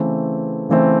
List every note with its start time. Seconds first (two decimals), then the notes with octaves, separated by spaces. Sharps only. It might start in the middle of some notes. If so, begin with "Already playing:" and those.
Already playing: C#3 E3 A3 C4
0.69 C#3 E3 A3 C4